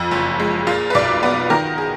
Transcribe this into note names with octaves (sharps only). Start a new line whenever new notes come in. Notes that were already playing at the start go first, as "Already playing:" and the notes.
Already playing: F2
F#1
G#3
A#2 F4
B4
B1 D5
B3 B4
D#3 A#4
G#4